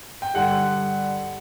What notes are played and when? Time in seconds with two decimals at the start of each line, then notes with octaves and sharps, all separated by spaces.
0.22 G5
0.34 G2 D3 G3 F#5